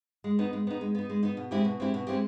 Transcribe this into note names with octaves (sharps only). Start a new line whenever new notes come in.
G#3
B3 D#4
G#3
B3 D#4
G#3
B3 D#4
G#3
B3 D#4
B2
G#3 C4 E4 G4
B2
G#3 C4 E4 G4
B2
G#3 C4 E4 G4